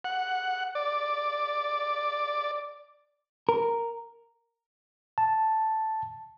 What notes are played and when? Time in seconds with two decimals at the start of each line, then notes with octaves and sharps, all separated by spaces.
0.04 F#5
0.75 D5
3.49 A#4
5.18 A5